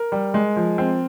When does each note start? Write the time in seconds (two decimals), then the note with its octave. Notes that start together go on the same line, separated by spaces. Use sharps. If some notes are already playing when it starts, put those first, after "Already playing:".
Already playing: A#4
0.12 G3
0.34 G#3
0.56 F3
0.78 C4